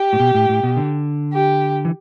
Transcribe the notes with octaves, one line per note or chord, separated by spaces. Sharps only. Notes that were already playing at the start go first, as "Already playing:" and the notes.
Already playing: G4
A2
B2
A2
A2
B2
D3
G4
E3